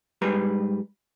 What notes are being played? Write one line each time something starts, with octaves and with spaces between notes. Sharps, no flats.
G#2 G3 B4 A#5